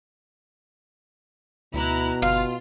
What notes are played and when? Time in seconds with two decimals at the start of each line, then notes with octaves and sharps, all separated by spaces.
1.74 D2 B2 E4 A#5 F#6
2.22 G1 F4 F5